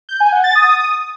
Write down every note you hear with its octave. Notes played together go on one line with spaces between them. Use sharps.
G6
G#5
F#5
A6
D#6